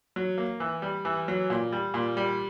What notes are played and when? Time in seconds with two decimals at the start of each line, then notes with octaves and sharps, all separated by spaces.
0.16 F#3
0.38 A#3
0.60 E3
0.82 G3
1.05 E3
1.28 F#3
1.50 A#2
1.72 G3
1.94 A#2
2.17 G3